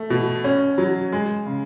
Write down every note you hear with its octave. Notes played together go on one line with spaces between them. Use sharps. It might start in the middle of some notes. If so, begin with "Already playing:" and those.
Already playing: A3
B2
C#4
F#3
G#3
C#3